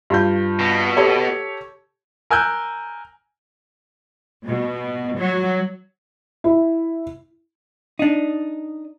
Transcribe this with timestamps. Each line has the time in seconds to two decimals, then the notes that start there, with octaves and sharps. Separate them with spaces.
0.10 G2 F4 G6
0.59 B2
0.97 G4 A4 C#5
2.30 A#4 G#5 E6 F#6 G6
4.45 B2
5.17 F#3
6.44 E4
7.99 D4 D#4